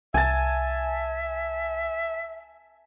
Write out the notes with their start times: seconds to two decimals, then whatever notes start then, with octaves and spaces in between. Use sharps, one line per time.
0.14 C2 E5 G#5 A5